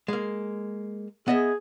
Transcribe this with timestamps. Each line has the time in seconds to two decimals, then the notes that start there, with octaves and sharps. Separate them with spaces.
0.08 G#3 A#3
1.28 B3 G#4 D#5 E5